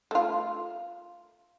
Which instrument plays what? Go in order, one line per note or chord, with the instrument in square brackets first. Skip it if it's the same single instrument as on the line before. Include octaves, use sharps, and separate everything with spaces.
[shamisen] A3 F4